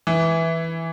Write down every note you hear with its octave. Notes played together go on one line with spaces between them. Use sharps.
E3